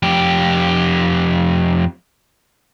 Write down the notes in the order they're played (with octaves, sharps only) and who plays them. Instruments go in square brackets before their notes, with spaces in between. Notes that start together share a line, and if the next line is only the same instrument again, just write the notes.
[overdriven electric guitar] F2 G4